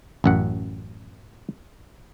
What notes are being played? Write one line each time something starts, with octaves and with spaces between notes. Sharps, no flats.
A1 F#2 F#5